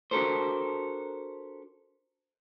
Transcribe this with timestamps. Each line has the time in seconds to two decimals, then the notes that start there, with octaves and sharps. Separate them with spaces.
0.11 D4 F#4 G4 A4 A#4 C5